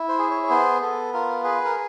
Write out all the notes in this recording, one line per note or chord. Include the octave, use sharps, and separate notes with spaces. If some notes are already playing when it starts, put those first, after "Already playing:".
Already playing: E4
C5
G#4
C#5
C#5
B3 C5
B3 A4
F4 A#4
G#4 B4
A#4